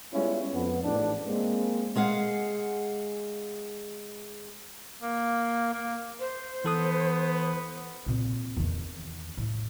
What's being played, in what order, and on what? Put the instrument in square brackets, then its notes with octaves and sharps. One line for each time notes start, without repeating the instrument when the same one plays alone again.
[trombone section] G3 G#3 B3 C#4 E4 F4
F2 B3
A1 G#2 D4
G#3 A#3 C4
[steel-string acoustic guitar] G#3 G#4 F5 F#5
[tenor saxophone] A#3
A#3
[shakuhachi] C5
[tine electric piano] E3 A4 D#6 [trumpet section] B3
[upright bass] A#2 C4
E2 D#3
A2